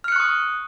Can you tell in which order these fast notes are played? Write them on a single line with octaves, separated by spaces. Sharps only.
F6 C#7 F#6 C#6 D#6